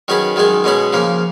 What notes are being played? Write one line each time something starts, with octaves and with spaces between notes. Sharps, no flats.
D#3 F#3 C#4 G#4 B4
F#2 D#3 G#3 D#4 G#4
B2 G#3 C#4 G#4 B4
C#3 F3 A#3